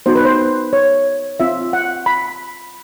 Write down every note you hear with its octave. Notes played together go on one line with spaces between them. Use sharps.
B3 D#4 F#4 C5
B4
C5
C#5
C4 F4 E5
F#5
B5